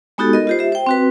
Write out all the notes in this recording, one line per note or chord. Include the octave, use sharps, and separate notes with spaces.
G#3 B3 D#4 F#4 G4 A4
A#4 D#5
F4 G4 C5
G4 E5
C5 G5
C4 F#4 B4